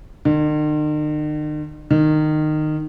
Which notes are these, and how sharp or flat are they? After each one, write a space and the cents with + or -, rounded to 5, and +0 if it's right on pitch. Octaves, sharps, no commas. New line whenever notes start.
D#3 -45
D#3 -20